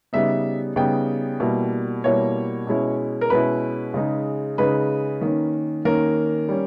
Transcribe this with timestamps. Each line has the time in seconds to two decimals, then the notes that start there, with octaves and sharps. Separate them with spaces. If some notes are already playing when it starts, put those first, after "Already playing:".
0.13 C#3 G3 B3 D#4 E5
0.76 C#3 G3 B3 D#4 G5
1.40 B2 G3 A#3 E4
2.04 B2 G3 A#3 E4 C#5
2.67 B2 G#3 C#4 E4
3.21 A#4
3.30 B2 G#3 C#4 E4 B4
3.94 C#3 G#3 D#4
4.58 C#3 G#3 D#4 B4
5.21 D#3 A#3 C#4
5.85 D#3 A#3 C#4 A#4
6.49 G3 C#4